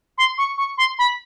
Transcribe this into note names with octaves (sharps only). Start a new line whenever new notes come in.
C6
C#6
C#6
C6
B5